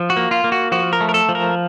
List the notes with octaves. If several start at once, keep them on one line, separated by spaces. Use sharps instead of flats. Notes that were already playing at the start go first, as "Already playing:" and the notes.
Already playing: F3
F#4
A#3
F4
A#3
F#4
F3 F#4
A#4
A3
A#4
A4
F3
A#4